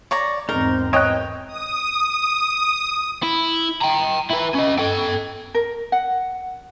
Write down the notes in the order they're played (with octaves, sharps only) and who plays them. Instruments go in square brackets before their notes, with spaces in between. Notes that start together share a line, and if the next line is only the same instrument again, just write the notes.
[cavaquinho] C#5 D5 A#5
[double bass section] E2 G#2 C4 [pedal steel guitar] D#4 [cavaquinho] A#4
[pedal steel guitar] E3 F#6 [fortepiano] C#5 D#5 G5
[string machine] D#6
D#6
[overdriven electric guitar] E4
G5 A#5
E4 B4
C#4 D#5
A4 G5
[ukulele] A#4
F#5